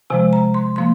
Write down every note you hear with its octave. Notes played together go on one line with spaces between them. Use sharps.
C3 F3 G#3 G#5
A#5
C6
F3 A#3 C6